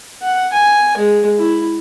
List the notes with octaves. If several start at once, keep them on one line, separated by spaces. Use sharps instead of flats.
F#5
G#5
G#3
E4